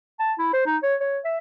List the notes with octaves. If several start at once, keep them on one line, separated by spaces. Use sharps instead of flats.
A5
E4
C5
D#4
C#5
C#5
E5